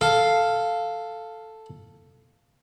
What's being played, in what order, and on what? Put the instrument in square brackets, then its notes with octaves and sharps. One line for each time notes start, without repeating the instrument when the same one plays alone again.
[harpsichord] A4 [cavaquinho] F5